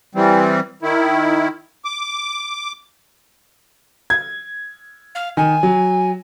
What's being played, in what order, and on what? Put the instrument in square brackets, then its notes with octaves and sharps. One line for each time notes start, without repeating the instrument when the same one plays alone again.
[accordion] E3 G3 C4
D#3 E4
D6
[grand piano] G#6
[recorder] F5
[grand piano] D#3 [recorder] G#5
[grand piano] F#3